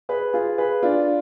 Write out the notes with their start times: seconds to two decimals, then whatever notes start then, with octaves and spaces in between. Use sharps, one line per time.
0.09 G#4 B4
0.34 F4 G#4
0.58 G#4 B4
0.83 D4 F4